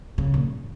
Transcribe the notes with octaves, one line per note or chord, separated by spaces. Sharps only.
C#3
A#2
E2